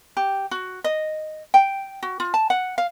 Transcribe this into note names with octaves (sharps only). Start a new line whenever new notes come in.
G4
F#4
D#5
G5
F#4
F4
A5
F#5
F5